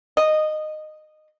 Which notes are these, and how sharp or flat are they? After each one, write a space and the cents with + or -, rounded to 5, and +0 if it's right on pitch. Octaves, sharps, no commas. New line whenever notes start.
D#5 -15